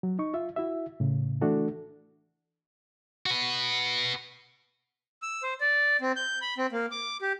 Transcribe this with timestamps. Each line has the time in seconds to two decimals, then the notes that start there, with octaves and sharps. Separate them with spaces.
0.03 F#3
0.19 D#4 C#6
0.34 F4 E5
0.56 E4 F#4 E5
1.00 A2 C#3
1.41 E3 A3 D4 F#4 A4
3.26 F#4 B4
5.22 E6
5.43 C5
5.61 D5
6.01 C4
6.16 G6
6.42 B5
6.58 C4
6.72 A#3
6.91 D6
7.22 G4